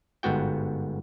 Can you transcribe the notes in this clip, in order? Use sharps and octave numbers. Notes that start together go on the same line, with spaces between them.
G1 G#2 B3 F#4 G5